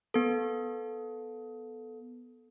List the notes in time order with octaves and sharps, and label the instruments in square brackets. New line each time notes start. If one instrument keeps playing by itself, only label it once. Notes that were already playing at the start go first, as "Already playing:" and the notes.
[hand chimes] B3 A4